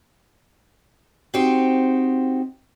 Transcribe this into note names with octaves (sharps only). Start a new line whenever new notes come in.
C4 D#4 F#4 G4 C5